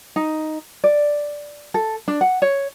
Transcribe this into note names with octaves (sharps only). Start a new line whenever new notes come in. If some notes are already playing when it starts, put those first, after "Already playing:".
D#4
D5
A4
D4
F#5
C#5